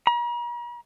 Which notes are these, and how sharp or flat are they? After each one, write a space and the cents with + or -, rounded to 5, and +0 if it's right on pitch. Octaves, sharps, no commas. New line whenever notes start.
A#5 +45